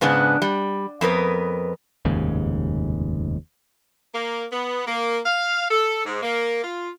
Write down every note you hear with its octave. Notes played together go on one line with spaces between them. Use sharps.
G#2 C#3 B3 D4
G3
F2 B3 A#4 B4
F1 D#2 G#2 C#3
A#3
B3
A#3
F5
A4
G#2
A#3
F4